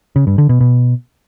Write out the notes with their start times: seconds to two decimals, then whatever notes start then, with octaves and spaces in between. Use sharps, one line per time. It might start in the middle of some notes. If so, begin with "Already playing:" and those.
0.16 C#3
0.27 G2
0.38 D3
0.49 B2
0.61 B2